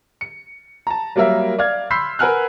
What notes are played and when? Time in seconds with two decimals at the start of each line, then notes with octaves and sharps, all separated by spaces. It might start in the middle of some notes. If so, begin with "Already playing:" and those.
0.21 C#7
0.87 A5 A#5
1.16 F#3 G3 A#3 A#4 E5
1.59 D5 F5 F6 G#6
1.90 B5 C6 E6 G6 B6 C7
2.19 A#4 B4 F#5 G#5 F6 F#6